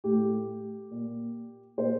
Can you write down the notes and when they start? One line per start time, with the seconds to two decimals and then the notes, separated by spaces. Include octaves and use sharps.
0.04 A2 G4
0.91 A#2
1.78 A#2 C5